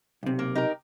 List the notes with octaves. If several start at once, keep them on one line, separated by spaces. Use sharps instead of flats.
B1 C3
A#3
D#4 G4 A#4